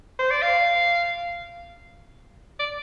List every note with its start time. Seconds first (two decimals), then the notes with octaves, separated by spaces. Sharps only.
0.19 C5
0.31 D5
0.42 F5
2.60 D5